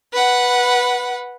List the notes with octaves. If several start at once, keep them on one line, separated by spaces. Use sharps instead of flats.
B4 F#5